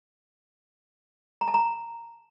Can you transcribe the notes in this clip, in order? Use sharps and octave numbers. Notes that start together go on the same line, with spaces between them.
A#5
A5
A#5